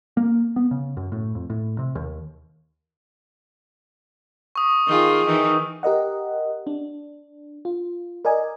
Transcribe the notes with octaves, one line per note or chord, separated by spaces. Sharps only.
A#3
B3
C#3
F#2
A2
F2
A2
C3
D#2
C#6 D#6
D#3 F4 G#4
D#3 E3
G4 A#4 D#5 F#5
D4
F4
A#4 D5 D#5 G#5